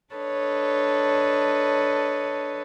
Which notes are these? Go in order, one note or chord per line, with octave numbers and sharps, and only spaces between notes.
D4 A4 B4 C#5 D#5